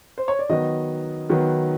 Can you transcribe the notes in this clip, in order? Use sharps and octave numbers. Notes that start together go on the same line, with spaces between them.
C5
C#5
D5
D#3 F#3 B3 D#5
D#3 F#3 B3